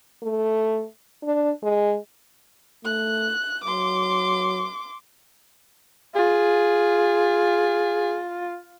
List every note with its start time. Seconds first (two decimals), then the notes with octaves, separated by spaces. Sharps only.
0.23 A3
1.23 D4
1.63 G#3
2.85 A3 F#6
3.64 F#3 C6 D6
6.16 F4 G#4